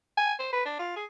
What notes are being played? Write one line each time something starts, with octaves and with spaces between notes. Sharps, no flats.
G#5
C5
B4
D4
F4
G#4